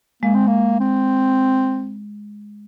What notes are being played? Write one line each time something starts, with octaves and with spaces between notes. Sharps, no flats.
G#3 A#3
C4
A#3
C4